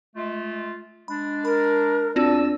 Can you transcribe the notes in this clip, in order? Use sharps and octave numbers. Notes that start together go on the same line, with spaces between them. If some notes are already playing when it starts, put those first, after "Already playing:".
G#3 A3 F4
G#3 D4 B5
A#4 B5
E2 C4 D4 F4 F#4 A5 E6